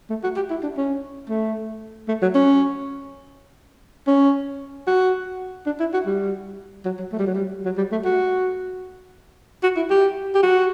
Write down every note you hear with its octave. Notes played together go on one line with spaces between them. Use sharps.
A3
F#4
G4
E4
D4
C#4
A3
A3
F#3
C#4
C#4
F#4
D4
E4
F#4
G3
F#3
F#3
A3
G3
F#3
G3
F#3
G3
A3
F#4
F#4
E4
G4
G4
F#4